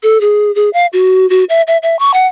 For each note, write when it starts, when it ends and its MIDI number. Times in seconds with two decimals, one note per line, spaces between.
0.03 0.20 69
0.21 0.54 68
0.55 0.70 68
0.73 0.86 77
0.93 1.28 66
1.30 1.44 66
1.49 1.62 76
1.68 1.77 76
1.83 1.98 76
1.99 2.11 85
2.14 2.26 78